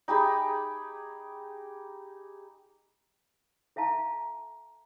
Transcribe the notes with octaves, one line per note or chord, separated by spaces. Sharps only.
D#4 G4 G#4 B5
A4 E5 F5 A5 A#5